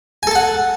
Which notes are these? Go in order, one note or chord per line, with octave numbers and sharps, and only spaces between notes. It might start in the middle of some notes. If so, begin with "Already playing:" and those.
A4 F#5 G#5 A5